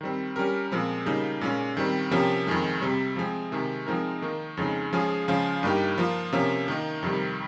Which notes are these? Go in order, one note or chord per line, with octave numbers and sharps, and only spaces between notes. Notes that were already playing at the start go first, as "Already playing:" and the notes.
D#3 G3 C4
G3 C#4 G4 A#4
A#2 F3 G#3 C4
C#3 G3 A#3 D#4
A#2 G#3 C#4
D#3 G3 C4
C3 F3 A#3 C#4 G4
F2 D#3 G#3
C3 G3 C4
F3 G#3 C4
C3 D#3 G#3
F3 G#3 C4 D#4 A#4
D#3 A#3 D#4
F2 C#3 G#3 D#4
F3 G#3 C#4 F4 G#4
C#3 F3 G#3 C#4 F4
G2 G3 A#3 D#4 G4
F3 A#3 F4
C3 F3 A#3 C#4
D#3 A#3 D#4
F2 C3 D#3 G3